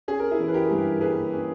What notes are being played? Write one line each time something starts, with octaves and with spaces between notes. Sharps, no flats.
C#4 G#4
A#4
E4 G#4
E3
B4
G4 A#4
G2
A#3 G#4 B4
C#4